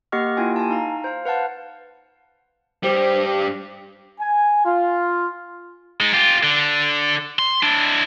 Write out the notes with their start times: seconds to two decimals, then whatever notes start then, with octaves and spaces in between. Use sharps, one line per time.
0.12 A#3 G4 D#5 F#5 C#6 F6
0.37 A#3 E4 F4 G4 G5 G#5
0.56 G#5 A5
0.69 D#4 F5 A#5
1.04 C5 F5
1.25 B4 F5 F#5 A5
2.83 G2 G3 C5
4.20 G#5
4.65 F4
6.00 G#3 D#4
6.14 F4 G4
6.43 D3
7.39 C6
7.63 D4 E4